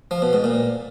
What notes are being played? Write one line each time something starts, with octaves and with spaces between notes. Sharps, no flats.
F3
B2
G#2
A#2